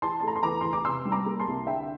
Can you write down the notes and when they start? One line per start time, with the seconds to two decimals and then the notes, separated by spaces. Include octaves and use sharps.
0.02 E3 A5 C6
0.20 A5
0.23 A3 A#5
0.36 C6
0.43 E2 A#5 D6
0.61 E2 C6
0.73 D6
0.84 C3 C6 E6
1.05 G3
1.12 A#5 D6
1.26 A#3
1.40 A5 C6
1.47 C2
1.67 D3 E5 G5